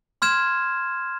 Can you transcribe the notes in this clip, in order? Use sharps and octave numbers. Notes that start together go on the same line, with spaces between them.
C6 F6 G#6 E7